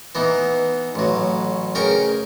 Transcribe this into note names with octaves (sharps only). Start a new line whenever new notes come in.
E3 B3 D#4
A1 F#3
C#3 A#4 G5 C#6